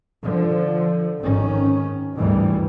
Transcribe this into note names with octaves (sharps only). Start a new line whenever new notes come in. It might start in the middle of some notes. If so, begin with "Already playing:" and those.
D3 F3
G#1 D#3 C#4
G#1 D2 G2 E3 G3